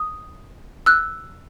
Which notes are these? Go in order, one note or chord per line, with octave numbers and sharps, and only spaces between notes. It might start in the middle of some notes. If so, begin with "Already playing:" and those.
Already playing: D#6
E6 F#6